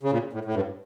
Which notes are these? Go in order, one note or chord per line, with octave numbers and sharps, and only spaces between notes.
C#3
A#2
A2
A2
G2